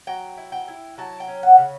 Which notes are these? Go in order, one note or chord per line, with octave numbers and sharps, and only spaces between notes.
F#3 G5
E4
G5
E4
F#3 A5
G5
C#4
F#5
C#3